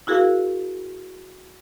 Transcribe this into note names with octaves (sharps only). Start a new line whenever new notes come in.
E4 F#4 G#4 A#4 F5